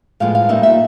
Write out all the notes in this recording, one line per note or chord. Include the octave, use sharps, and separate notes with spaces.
A2 F3 G#3 B3 F5
F5
A#2 G3 A#3 D#4 E5
E5